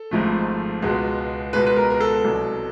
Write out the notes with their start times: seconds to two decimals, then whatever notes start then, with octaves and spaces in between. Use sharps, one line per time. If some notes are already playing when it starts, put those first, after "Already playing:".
Already playing: A4
0.11 G#1 G#2 F3 A3
0.82 C#2 B2 G#3 B3
1.53 C#2 B2 G#3 B3 B4
1.67 B4
1.76 A#4
1.90 A#4
2.00 A4
2.25 C2 B2 F#3